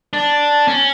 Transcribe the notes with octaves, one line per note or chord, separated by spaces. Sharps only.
D4
C#4